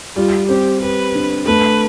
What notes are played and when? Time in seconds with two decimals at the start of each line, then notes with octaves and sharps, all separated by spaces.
0.16 G3 F4
0.48 C4 G4
0.82 G4 B4
1.15 D3
1.46 A3 B4